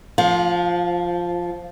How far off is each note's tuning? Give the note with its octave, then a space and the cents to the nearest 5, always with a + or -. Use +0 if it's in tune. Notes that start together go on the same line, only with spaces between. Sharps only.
F3 +0 F5 +35